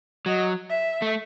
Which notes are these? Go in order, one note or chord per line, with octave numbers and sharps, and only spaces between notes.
F#3 D#5
E5
A3